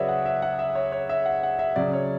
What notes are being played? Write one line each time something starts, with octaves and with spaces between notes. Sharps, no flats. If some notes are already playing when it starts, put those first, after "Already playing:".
Already playing: C#3 F#3 F#4 G#4 B4 C#5 D5 E5
F#5
E5
F#5
E5
C#5
C#5
E5
F#5
F#5
E5
C#3 F#3 D5
C#5